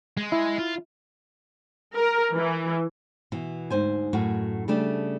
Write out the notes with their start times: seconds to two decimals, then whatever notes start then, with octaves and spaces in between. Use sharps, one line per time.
0.17 G#3
0.32 E4
0.58 F4
1.97 A#4
2.36 E3
3.32 B2 E3
3.70 D2 G#2 C5 G#5
4.13 F#2 A2 F#4
4.68 C#3 G3 A3 D4